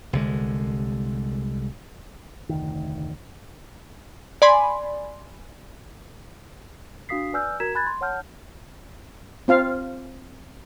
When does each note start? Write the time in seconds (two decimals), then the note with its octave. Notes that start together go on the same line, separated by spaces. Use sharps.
0.13 C2 D3 G#3
2.49 F1 D2 D#3
4.42 D5 G#5 B5 C6
7.09 D4 F#4 F5 D#6 B6 C7
7.33 B4 D5 G#5 E6 F6 G6
7.60 F#4 A#4 A#5 G#6 B6 E7
7.75 G#5 B5 F#6 G#6 A6
7.87 C6
8.01 C#5 F#5 A5 F6 G6
9.48 C4 F4 F5